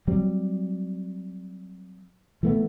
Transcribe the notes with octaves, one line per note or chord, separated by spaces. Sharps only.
F#3 G3 C4
E3 A3 B3